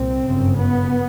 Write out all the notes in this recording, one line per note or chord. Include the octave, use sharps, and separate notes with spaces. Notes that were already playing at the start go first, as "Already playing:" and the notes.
Already playing: C2 A#2 C4
G1 F#2 C#3
B3